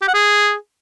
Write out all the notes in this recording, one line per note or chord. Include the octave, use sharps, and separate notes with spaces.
G4
F#5
G#4